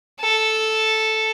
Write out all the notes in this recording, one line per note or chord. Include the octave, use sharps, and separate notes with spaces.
A4